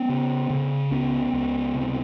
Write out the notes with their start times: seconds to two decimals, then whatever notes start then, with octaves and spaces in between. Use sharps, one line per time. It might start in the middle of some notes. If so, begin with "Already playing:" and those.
Already playing: B3 C#4
0.09 C#3
0.50 C#3
0.91 C#2 B3 C#4
1.33 C#2
1.74 C3